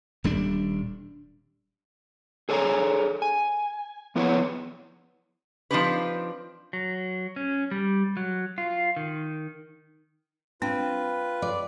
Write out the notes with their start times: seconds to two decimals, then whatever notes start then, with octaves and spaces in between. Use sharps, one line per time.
0.24 D#1 G3 D4
2.49 G#4 A4 C#5 F5 G#5 A#5
3.22 G#5
4.16 F3 B3 E4 B4 C#5 F#5
5.71 F3 C4 D4 D#4 G4 B4
6.73 F#3
7.36 C#4
7.71 G3
8.17 F#3
8.58 F4
8.96 D#3
10.62 C4 D4 F4 B4
11.42 D5